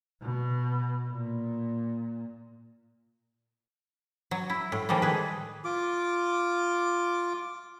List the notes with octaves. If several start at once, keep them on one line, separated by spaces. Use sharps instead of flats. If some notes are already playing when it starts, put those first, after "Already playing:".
B2
A#2
F#3
E4
A2
D#3 F3 G3 G#3 A#3
G#4 B4
F4 D6